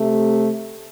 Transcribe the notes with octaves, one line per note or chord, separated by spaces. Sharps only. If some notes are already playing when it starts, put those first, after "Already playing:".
Already playing: C3 A3